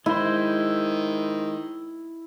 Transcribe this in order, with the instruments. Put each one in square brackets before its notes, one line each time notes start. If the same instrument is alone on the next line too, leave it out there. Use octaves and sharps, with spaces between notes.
[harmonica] D#3 [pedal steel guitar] G#3 C5 [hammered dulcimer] E4